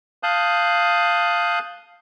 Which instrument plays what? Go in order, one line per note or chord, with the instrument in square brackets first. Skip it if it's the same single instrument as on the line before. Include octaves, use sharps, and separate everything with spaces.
[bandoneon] F5 A5 D#6 F#6 G6